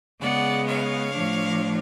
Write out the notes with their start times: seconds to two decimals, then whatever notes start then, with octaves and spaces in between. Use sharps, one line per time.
0.21 C#3 G#3 B3 D5 F#5
0.66 C#5 F5
1.13 A2 F3 A3 D4